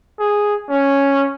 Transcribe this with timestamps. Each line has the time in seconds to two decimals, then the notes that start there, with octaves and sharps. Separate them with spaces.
0.20 G#4
0.70 C#4